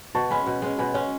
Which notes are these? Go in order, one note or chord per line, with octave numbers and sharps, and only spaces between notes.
B2 A5 C#6
G#3 C#4 G#5 B5
B2
G#3 C#4
B2 G#5 B5
G#3 C#4 C#5